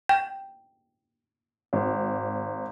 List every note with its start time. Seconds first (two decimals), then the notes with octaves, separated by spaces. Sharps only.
0.09 G5
1.73 G#1